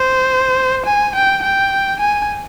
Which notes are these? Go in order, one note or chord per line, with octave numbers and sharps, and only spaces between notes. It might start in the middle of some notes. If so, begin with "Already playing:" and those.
Already playing: C5
G#5
G5
G5
G#5